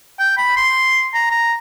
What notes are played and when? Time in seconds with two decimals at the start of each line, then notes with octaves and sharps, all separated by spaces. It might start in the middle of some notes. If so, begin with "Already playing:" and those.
0.19 G5
0.37 B5
0.56 C6
1.14 A#5
1.31 A#5